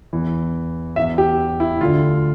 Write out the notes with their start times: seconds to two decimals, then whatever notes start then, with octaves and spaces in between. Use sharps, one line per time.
0.13 E2 E3
0.96 E2 E3 E5
1.18 G4
1.60 E4
1.81 D2 D3 F4